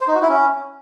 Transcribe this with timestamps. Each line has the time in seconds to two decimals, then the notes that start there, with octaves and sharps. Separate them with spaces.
0.01 C5
0.08 D#4
0.15 F#4
0.22 E4
0.29 C#4